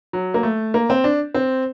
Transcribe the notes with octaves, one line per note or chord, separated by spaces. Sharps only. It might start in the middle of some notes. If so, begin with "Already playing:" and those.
F#3
A#3
A3
A#3
C4
D4
C4